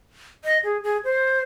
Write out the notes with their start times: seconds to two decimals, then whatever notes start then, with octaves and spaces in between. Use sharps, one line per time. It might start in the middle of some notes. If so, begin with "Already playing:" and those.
0.44 D#5
0.64 G#4
0.84 G#4
1.04 C5